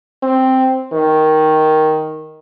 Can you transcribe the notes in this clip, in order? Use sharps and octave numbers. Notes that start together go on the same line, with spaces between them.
C4
D#3